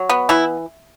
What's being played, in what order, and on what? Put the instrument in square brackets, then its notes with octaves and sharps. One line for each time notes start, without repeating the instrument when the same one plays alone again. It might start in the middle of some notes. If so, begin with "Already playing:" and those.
Already playing: [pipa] F#3
B3
E3 E4